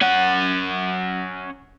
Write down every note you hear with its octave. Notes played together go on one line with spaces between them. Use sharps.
C#4 F#5